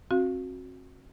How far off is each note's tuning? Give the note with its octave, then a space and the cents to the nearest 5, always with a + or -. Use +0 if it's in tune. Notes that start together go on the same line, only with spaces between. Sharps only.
C4 +40 F#4 -20 F5 +0